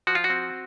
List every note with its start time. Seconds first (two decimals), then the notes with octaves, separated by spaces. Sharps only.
0.07 F3 F#4
0.15 F4
0.24 F#4
0.30 C4